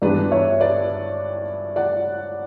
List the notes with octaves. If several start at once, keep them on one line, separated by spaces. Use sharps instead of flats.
G2 E3 G3 B3 D4 B4 D5
C#5 E5
B4 D5
D5 F#5